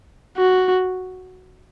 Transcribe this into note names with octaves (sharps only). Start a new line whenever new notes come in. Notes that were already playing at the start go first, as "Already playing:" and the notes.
F#4